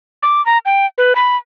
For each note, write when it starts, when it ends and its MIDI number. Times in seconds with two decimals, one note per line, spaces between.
0.23 0.44 86
0.46 0.58 82
0.66 0.86 79
0.98 1.13 71
1.15 1.36 83